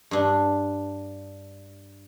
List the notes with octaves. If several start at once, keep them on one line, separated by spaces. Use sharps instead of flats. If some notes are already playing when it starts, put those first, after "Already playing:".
G2 D4